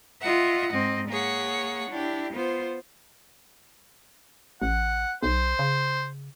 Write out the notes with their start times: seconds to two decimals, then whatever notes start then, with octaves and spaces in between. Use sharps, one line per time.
0.20 F4 D#5 E5 F#5
0.70 G#2 C4 D#5
1.08 A#3 G#4 C#5 F#5
1.89 D4 E4 G4
2.33 B3 F4 C5
4.62 A1 F#5
5.23 B1 C5
5.59 C#3